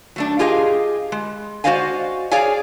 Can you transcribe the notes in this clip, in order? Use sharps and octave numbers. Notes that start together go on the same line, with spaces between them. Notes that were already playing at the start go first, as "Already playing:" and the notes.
F#3 A3 D4
F4 G4 G#4 D#5 F5
G#3
F#4 C5 D5 D#5 F5 G#5
G#4 C#5 D5 F5 G#5